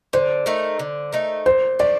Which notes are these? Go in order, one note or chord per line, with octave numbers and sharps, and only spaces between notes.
D3 C5
A3 D#4 A#4
D3
A3 D#4 A#4
A#2 C5
F3 A3 D4 D5